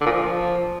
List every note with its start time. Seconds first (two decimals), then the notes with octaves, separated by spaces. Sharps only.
0.01 D3
0.06 A#2
0.11 F3